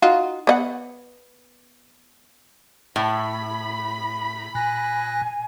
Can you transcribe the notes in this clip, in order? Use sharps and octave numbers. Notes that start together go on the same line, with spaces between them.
D#4 F4 F#4
B3 D#5 F#5
A2 B5
A#2 G#5 F#6 A#6